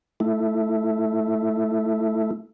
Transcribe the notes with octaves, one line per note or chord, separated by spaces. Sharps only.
A3 E4